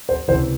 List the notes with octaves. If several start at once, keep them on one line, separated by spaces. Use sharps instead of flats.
C5
C#2 C3 E3 C5